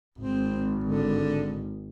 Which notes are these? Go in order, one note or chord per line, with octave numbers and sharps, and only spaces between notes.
G#1 C4
D3